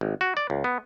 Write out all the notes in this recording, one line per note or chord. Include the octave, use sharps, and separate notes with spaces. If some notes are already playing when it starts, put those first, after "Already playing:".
G#1
F#4
D5
C#2
B3